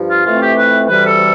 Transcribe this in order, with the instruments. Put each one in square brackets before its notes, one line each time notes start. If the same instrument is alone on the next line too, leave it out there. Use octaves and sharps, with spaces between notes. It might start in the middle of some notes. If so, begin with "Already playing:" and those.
Already playing: [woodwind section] G2 F3
F4
F2 E3 A3 C4 F4
G4
B4
D2 C3 E3 G3 B4
A4